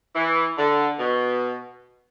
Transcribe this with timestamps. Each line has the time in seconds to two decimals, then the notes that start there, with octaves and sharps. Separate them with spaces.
0.15 E3
0.58 D3
0.99 B2